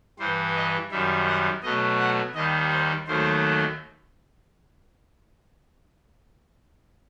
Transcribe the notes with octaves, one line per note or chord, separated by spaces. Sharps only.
G2 E3 G3 C5
D#5
F#2 D#3 G3 E5
F#5
B2 F#3 A3 D#5
F#5
D#2 D#3 G3 D#5
C5
D#2 D#3 F#3 A3 C5